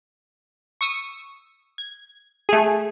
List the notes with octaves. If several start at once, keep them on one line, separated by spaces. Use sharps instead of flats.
C#6 D#6 E6
G#6
A3 G#4